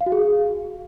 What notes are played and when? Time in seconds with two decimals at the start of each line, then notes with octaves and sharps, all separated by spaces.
0.01 F5
0.06 F#4
0.12 G#4